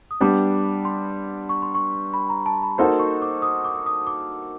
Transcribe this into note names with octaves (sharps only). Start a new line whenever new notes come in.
D#6
G3 B3 D4 G4 D6
C6
C#6
C6
C#6
B5
A#5
A5
B5
A#3 D#4 F#4 A4 C5 C6
C#6
D6
D#6
D6
D#6
D6